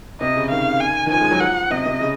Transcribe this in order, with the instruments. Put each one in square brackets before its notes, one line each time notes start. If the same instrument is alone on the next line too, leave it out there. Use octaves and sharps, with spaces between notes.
[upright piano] C3 [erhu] D#5
[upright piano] C#3
[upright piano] D#3 [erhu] F5
[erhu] G#5
[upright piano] D#3
[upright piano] F3 [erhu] G#5
[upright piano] G#3
F#3
[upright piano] F3 [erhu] F#5
[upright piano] C3 [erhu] D#5
[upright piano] C3
C#3